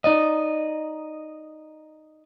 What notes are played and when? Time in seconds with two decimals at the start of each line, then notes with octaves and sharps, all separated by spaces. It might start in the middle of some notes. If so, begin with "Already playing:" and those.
0.04 D#4 D5 D#5